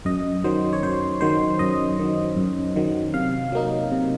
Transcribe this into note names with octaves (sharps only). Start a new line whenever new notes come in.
F#2 D#5
D#3 F#3 C5
C#5
F#2 C5
D#3 F#3 C5
F#2 D#5
D#3 F#3
F#2
D#3 F#3
C3 F5
F#3 A#3 D#4
C3